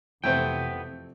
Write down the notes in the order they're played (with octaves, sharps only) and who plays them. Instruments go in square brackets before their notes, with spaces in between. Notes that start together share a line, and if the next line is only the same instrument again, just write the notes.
[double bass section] F2 C3 [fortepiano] E3 A3 C4 [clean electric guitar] B3 G5 [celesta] G6